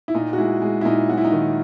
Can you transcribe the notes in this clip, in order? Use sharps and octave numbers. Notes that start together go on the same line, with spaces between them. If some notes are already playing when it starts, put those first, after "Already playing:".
E4
A#2 D#4
F#4
G#3 E4
G#3
E4
A#2 D#4
F#3 F#4
E4
D#4
D#3 E4